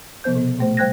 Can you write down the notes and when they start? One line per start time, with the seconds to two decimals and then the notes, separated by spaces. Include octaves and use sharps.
0.24 C3 F3 B3 C5 G6
0.35 B2 F3 B3
0.59 A#2 A3 C5
0.77 G3 C5 G5 F#6 G#6 A#6